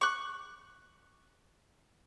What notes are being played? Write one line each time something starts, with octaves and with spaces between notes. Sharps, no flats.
C#6 F#6